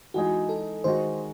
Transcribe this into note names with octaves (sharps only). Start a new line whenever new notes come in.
E3 G#3 D#4 F#4 G#4
A4
D#3 G#3 D#4 F#4 C5